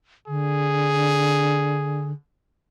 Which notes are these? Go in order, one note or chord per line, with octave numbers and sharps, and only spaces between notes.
D3 G#4